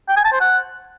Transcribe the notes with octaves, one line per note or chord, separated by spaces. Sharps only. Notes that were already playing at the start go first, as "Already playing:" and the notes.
G5
G#5
A5
C5
F#5